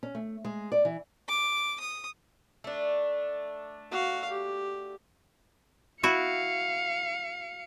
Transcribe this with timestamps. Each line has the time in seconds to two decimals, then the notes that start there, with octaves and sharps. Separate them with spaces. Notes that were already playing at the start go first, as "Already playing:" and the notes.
0.03 C#4
0.15 A3
0.45 G#3
0.72 D5
0.85 E3
1.28 D6
1.80 D#6
2.64 A3 D4
3.91 F#4 F5
4.30 G4
6.03 E4 F#4 F5 C#7